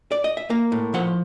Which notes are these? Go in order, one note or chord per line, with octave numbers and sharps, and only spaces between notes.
D5
D#5
E5
A#3 F5
A2
F3 F#5